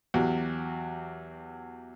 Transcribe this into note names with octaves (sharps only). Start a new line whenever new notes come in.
E2 F#3 F#4 G4